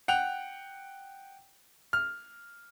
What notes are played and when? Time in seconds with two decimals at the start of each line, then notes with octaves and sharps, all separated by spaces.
0.08 F#5 G5 F7
1.93 F6